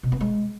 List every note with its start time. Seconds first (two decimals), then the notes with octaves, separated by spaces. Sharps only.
0.03 B2
0.12 B3
0.21 G#3